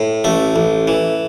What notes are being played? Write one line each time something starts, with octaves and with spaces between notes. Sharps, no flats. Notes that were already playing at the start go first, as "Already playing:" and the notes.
Already playing: A2
A1 A3
A1
E3